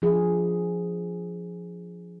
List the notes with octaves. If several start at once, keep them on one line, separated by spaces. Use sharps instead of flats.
F3 D4 G#4